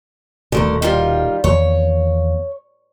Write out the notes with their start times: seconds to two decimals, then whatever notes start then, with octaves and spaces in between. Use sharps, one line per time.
0.52 D#1 D#2 B2 D3 A3 A#4
0.82 D#3 G3 F4
1.44 E2 D#3 A#3 C#5